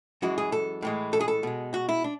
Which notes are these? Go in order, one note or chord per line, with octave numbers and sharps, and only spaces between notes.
F#2 E3 G#3 F#4
G#4
A4
A2 E3 G#3
A4
G#4
A4
B2 G#3
F#4
E4
D4